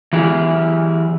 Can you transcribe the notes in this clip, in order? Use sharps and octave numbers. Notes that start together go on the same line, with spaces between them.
E3 E4 G4 G#4